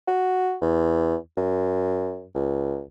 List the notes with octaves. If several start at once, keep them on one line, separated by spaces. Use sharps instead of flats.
F#4
E2
F#2
C#2